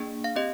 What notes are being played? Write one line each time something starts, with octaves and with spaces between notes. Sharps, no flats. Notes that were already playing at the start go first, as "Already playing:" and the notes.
Already playing: A#3 D4 G#4
F5
C4 G4 D#5